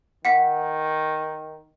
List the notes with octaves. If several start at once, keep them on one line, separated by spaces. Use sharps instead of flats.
D#3 F#5 B6